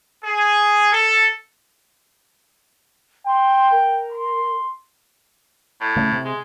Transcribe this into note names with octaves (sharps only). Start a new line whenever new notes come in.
G#4
A4
G5 C6
A#4
C6
A2
C#3 A3
C3
G#3